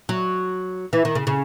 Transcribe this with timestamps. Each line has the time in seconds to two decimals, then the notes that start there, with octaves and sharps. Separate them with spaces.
0.09 F#3
0.93 E3
1.05 D#3
1.15 C#3
1.27 C#3